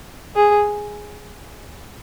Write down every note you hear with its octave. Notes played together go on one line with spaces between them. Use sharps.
G#4